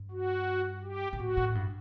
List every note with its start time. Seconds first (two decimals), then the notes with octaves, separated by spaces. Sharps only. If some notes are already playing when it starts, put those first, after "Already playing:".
Already playing: G2
0.11 F#4
0.83 G4
1.13 B2
1.19 A2 F#4
1.37 A2
1.55 G2